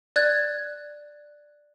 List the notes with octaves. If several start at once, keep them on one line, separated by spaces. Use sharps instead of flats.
D5 F#6 G#6